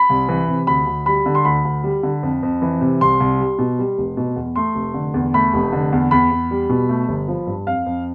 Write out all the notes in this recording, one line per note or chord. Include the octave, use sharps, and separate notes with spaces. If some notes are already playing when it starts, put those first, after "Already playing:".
Already playing: B5
C2
E3
C3
D2 B5
D2
G3 B5
D3
C6
D2 B5
D2
G3
D3
F2
F2
E3
C3
C2 C6
C2
G3
B2
G3
F1
B2
E2
A3 C6
F1
D3
E2
A3 B5
F1
D3
E2
E2 B5
E2
G3
B2
A3
G1
F3
G2
F2 F5
F2